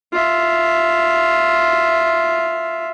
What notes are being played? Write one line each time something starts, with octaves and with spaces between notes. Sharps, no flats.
F4 E5